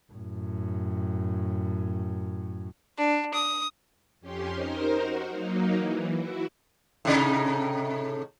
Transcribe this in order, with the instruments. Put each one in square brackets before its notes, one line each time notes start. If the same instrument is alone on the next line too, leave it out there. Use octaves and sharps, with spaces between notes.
[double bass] F#2 A2
[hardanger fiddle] D4
D#6
[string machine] F2 C#4 G4 C6
D#4 A#4 C5
F#4
F#3 A#3 D#4
E3
E4 F#4
[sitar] A2 C3 D#4